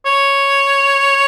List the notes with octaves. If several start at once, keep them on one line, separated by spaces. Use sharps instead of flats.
C#5